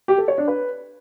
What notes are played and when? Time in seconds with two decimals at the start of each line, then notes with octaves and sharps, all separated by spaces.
0.08 G4
0.18 A4
0.28 C#5
0.38 D4
0.48 B4